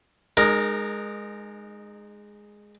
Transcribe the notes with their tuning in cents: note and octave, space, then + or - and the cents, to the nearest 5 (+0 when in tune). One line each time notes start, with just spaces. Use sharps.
G#3 +0 D#4 -35 A#4 +5